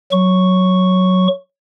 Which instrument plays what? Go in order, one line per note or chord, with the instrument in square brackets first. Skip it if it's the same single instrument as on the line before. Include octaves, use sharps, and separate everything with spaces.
[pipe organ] F#3 C#6